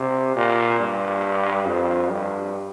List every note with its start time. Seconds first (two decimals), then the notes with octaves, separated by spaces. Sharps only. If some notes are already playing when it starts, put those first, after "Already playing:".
Already playing: C3
0.36 A#2
0.79 G2
1.67 F2
2.11 G2